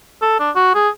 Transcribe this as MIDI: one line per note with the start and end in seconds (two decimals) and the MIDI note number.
0.22 0.39 69
0.40 0.50 62
0.55 0.75 66
0.75 0.89 68